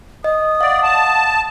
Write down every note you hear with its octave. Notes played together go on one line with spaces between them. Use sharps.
D#5 D#6
D5 F5 F#5
A5